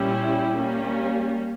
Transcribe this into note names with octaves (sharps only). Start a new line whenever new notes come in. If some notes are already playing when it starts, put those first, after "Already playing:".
Already playing: A#2 G3 C#4 E4 G4
G3 A#3 C#4